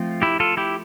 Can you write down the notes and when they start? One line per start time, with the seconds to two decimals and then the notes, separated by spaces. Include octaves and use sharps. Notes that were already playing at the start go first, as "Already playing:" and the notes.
Already playing: F3 A3 C4 F4
0.22 E4 G4
0.40 F4 A4
0.57 E4 G4